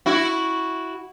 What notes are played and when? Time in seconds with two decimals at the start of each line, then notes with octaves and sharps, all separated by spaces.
0.06 E4 F#4